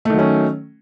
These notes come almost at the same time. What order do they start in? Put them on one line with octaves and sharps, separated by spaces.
A3 D#3 F#3 C#4